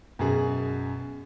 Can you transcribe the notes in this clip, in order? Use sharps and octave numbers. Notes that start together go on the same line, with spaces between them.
F#2 B2 G#4